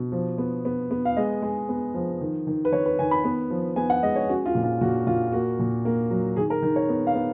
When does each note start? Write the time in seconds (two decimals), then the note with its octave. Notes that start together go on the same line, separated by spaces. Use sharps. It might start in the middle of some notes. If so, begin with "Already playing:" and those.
Already playing: B2
0.12 F3
0.38 B3
0.65 B3
0.91 B3
1.05 F5
1.16 G#3 D#5
1.42 G#3
1.69 B3
1.94 F3
2.21 D#3
2.47 D#3
2.65 B4
2.72 D#3 C#5
2.86 B4
2.99 D#3 G#5
3.11 B5
3.24 B3
3.50 F3
3.76 B3 G#5
3.90 F#5
4.03 G#3 D#5
4.16 C#5
4.29 C#4 F#4
4.46 F4
4.55 A#2
4.64 F4
4.81 A#2 F#4
5.07 A#2 F4
5.32 A#3 F#4
5.59 A#2
5.85 A#3
6.11 F#3
6.36 D#3 G#4
6.50 A#4
6.62 D#3
6.76 C#5
6.89 B3
7.07 F5
7.15 B3